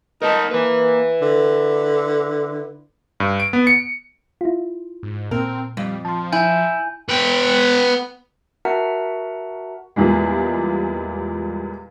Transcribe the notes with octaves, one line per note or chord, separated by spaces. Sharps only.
D#4 A#4 D#5 A5
A#3 E4 B4
D3
G2
D7
B3
C#7
E4 F4
G#2
A#2 C4 A#4
F2 G3
F3 A5 C6
E4 G#5 G6
B3 G5
F#4 A#4 E5 F#5 A5 A#5
E2 A#2 G3 G#3